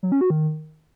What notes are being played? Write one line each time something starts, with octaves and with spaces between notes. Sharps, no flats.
F#3
C#4
F#4
D#3